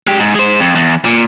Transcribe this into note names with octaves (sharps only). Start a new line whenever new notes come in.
G#3 G4
G#2
G#3 C5
F2
E2
A#2